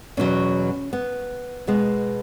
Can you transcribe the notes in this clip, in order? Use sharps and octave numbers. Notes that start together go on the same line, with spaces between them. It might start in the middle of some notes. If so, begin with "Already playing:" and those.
E2 B2 F#3 C#4
B3
B2 G#3 B3